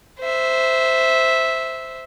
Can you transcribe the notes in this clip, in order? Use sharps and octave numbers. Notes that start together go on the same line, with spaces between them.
C5 E5